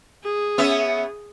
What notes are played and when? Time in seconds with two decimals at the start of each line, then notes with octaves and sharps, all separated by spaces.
0.24 G#4
0.58 B3 C#4 E5